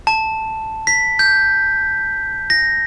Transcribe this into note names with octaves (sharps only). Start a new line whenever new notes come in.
A5
B6
G6
A#6